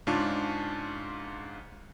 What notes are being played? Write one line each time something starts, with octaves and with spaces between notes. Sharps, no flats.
G#2 C#3 D4 F4 A5 C#6